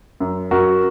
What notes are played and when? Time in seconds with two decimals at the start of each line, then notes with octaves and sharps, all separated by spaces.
0.20 F#2
0.51 F#2 F#4 A#4